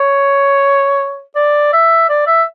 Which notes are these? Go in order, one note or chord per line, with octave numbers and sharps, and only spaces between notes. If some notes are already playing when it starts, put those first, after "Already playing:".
Already playing: C#5
D5
E5
D5
E5